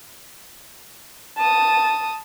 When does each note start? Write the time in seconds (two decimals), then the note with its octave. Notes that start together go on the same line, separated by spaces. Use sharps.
1.38 A5 D#6